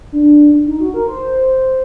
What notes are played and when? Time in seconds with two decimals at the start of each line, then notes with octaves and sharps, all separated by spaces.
0.12 D4
0.67 D#4
0.80 F#4
0.94 A#4
1.08 C5